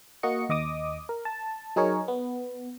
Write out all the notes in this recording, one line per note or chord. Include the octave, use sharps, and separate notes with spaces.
A#3 F#4 D#5 C#7
D#2 D#5 D6 D#6
A#4
A5
F#3 D#4 G#4 A#4 C#5
B3